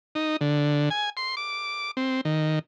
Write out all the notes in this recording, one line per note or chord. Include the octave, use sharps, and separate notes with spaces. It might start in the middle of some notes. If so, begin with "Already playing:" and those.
D#4
D3
G#5
C6
D6
C4
D#3